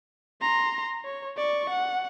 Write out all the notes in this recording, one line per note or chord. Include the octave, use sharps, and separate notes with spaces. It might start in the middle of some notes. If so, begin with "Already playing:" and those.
A#5 C6
C#5
D5 C#6
F#5